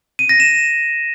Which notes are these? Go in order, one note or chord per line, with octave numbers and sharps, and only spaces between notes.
D#7
A#6
E7